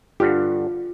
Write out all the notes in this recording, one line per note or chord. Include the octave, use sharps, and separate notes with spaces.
G2 D3 F4 G4